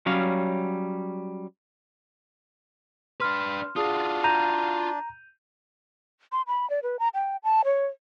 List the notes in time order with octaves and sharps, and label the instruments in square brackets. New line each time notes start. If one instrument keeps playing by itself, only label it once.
[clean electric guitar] F#3 G3 C#4 F5
[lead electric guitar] D4 B4 [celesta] C6 F6
[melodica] D4 [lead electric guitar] F4 F#4 [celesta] G#4 D#6
[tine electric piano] A#5 [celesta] G6 D#7 F7
[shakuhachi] C6
B5
D5
B4
A#5
G5
A5
C#5